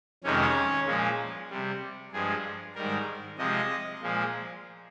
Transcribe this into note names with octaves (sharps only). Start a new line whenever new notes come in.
F2 C3 D#3 G#3 C#4
A#2 F3 G#3
C3 G3
G2 F3 G#3 G#4
G#2 D#3 G3 A#4
C3 F3 G#3 D#5
A#2 F3 G#3